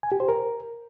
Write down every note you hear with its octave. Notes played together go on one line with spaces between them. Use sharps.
G#5
G4
C5
A#4